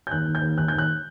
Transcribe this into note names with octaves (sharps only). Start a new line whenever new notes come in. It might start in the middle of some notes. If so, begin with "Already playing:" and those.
G6
D#2 F#6
D#2
G6
D#2
D#2 F#6
G6
D#2 F#6